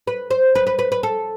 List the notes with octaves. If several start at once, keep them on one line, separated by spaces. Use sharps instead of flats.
B4
C5
B4
B4
B4
B4
A4